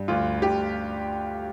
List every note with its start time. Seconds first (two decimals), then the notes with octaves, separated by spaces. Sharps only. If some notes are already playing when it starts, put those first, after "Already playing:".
Already playing: G2
0.08 D2 F4
0.42 D2 G4